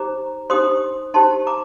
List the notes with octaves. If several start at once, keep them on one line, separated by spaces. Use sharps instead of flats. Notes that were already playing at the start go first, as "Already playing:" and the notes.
Already playing: D#4 G4 C5 A#5 D6
D#4 G4 C5 C6 D#6
D#4 G4 C5 A5 C6
A#5 D6